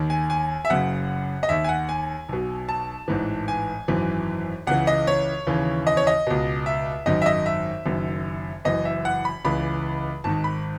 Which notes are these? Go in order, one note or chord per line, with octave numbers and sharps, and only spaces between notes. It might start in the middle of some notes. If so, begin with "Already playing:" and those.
Already playing: D#2 D#3
G#5
G#5
E5
F#1 F#2 C#3 F#5
D#5
D#2 D#3 E5
G#5
F#5
G#5
B1 B2
A5
A1 G#2 E3
G#5
G#1 F#2 E3
C#2 C#3 E3 F#5
D#5
C#5
D#2 C#3 E3
D#5
C#5
D#5
C#2 B2
E5
G#1 F#2 D#3 D#5
E5
D#5
E5
F#1 F#2 D#3
F#1 F#2 E3 D#5
E5
F#5
B5
C#2 C#3 E3 B5
G#1 G#2 D#3 A5
B5